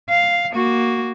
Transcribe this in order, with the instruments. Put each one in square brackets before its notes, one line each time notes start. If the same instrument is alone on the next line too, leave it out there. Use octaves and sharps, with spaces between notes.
[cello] F5
A#3 F#4